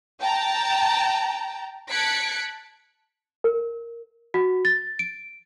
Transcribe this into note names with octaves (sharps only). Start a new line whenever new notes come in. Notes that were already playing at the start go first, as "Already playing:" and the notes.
G5 A5 A#5
A5 F#6 G#6 B6 C#7 D7
A#4
F#4
A6
D7